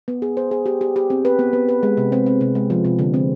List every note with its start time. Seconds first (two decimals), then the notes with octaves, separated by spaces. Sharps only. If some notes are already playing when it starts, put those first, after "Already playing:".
0.08 B3
0.22 G#4
0.37 C5
0.51 G#4
0.66 G4
0.81 G4
0.96 G4
1.10 C4
1.25 B4
1.39 B3
1.53 B3
1.68 B4
1.83 G#3
1.97 C3
2.12 C4
2.26 C4
2.41 C3
2.55 G#3
2.70 F3
2.85 C3
2.99 D3
3.14 C4